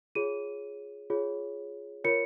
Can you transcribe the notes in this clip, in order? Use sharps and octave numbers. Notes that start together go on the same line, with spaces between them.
F4 G#4 C#5 D#7
F4 G#4 C#5
F4 A#4 C#5 C#7